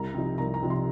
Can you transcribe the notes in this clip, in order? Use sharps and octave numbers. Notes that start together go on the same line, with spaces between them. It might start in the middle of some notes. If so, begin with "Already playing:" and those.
Already playing: C2 A#5
C3 F3 D#4
C2 A#5
A#5
C3 F3 D#4
C6